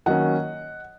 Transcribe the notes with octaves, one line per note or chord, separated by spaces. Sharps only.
D#3 F#3 A#3 C#4 D#5 F#5